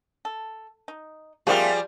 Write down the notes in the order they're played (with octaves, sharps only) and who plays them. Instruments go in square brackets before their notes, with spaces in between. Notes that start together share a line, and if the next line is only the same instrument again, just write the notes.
[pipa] A4
D#4
[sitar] F3 G3 F4 [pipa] A3 A#3 C4 [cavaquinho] G#4